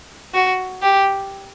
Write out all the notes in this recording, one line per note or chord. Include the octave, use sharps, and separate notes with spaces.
F#4
G4